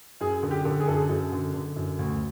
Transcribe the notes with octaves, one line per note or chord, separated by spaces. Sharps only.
F#2 G#4
D3
G4
D3
G#4
F#2 A4
G#4
F#2
D3
D3
F#2
D2